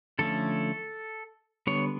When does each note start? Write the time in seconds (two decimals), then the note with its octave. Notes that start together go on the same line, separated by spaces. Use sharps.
0.19 D3 F3 A3 C#4 A4
1.67 D3 G3 B3 C#5